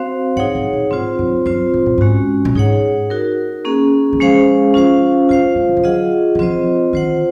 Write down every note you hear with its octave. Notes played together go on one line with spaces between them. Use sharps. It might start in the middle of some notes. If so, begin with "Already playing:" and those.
Already playing: C4 F#4 C5 F5
G#2 D#4 G#4 C#5 F#5
G#2
A#2
G#2 C4 F4 C5
F#2
F#2 C4 F4 C5
G#2
A#2
G#2 G#3 C#4 F#4
A#2
G#2 D#4 G#4 C#5 F#5
D#4 F#4 A#4
A#3 C#4 G#4
D#3
F3 G#3 C#4 G#4 C5 F5
F3 C#4 F4 C5 F5
G#3 F4 C5 F5
G#3
D#3
F3
F#3 F4 G#4 D#5 F#5
D#3
F3 C4 F4 C5 D#5
D#3 F4 C5 F#5